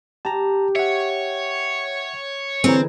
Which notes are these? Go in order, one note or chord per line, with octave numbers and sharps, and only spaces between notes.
G4 A5 A#5
C#5 E5 F#5
D3 E3 C4 G#4 A#5